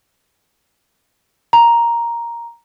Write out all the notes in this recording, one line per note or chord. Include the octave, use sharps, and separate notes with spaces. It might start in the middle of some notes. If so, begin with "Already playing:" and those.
A#5